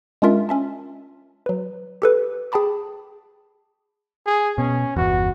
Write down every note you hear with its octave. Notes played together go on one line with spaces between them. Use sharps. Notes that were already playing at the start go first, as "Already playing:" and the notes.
G#3 C#4 D4 F4 A#4 E5
C#4 E5 A5
F#3 B4
G4 A4 B4
G#4 G5 A5 B5 D6
G#4
B2 C#4
G1 E2 F#4